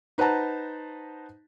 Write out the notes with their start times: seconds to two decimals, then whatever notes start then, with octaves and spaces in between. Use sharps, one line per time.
0.18 D#4 B4 C5 F#5 A5 A#5